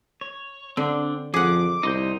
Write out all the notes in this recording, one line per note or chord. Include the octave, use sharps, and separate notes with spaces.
C#5
D3 C4 D4
F2 F3 G#4 F#5 D6
C2 D#4 C6 G6